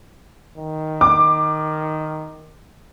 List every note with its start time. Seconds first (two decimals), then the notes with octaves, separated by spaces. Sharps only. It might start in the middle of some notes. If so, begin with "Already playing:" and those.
0.58 D#3
1.01 D6